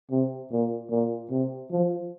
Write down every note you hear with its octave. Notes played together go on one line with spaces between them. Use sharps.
C3
A#2
A#2
C3
F3